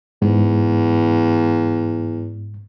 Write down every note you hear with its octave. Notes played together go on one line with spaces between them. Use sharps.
E2 G#2